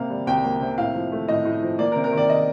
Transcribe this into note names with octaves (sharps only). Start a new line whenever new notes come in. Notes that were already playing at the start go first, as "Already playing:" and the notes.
Already playing: C3 A#3 F5
G3
C2 G5
A#3
C3
A2 F5
F3
A3
A2 D#5
A2
F3
A#3 D5
A#4
C3
A#4
D#3
D5
D#5